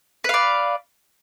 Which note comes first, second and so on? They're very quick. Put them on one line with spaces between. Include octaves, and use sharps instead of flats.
B4 F5 D5